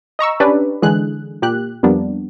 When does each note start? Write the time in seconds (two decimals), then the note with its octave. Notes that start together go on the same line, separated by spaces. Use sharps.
0.19 D#5 A#5 C#6 E6
0.40 C#4 D4 G4 B4 D5
0.82 D3 E3 G#3 G#4 F#6
1.42 A#2 G4 F#6
1.83 F2 G3 A#3 B3 D4